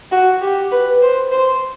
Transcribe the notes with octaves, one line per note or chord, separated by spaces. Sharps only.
F#4
G4
B4
C5
C5